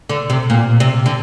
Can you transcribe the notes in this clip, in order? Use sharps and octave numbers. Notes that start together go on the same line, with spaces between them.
D3
C3
A#2
C3
D3